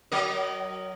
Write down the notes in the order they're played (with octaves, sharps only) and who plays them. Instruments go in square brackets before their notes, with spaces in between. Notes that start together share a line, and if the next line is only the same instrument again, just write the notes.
[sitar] F#3 A#4 D#5